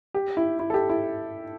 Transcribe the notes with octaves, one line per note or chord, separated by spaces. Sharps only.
G4
E4
E4
A4
G4
E4